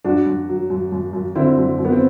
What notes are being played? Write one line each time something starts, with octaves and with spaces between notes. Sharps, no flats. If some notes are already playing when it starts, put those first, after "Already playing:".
F#2 D4 F#4
F#2
F#3
F#2
F#2
F#2
D3 C4 E4
F#2
F#2
B3
C4